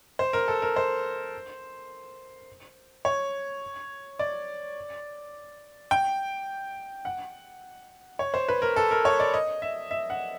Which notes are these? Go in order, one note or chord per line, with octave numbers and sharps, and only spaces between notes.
C5
A#4
A4
A#4
C5
C#5
D5
G5
F#5
C#5
C5
B4
A#4
A4
A#4
C#5
D5
D#5
E5
E5
F#5